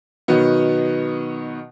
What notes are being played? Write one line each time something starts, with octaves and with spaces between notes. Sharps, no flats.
B2 D#3 F#3 B3